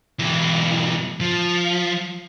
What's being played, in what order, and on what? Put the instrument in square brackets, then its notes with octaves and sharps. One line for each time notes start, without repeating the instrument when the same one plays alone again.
[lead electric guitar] B1 E3
F3